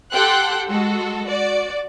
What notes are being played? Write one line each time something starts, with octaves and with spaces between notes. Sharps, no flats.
G4 A4 F#5 G5 C6 F#6
G#3 F#4 A4
F#4 D5